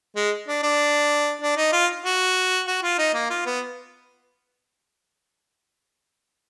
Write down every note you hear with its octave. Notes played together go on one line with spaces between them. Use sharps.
G#3
D4
D4
D4
D#4
F4
F#4
F#4
F4
D#4
A#3
F4
B3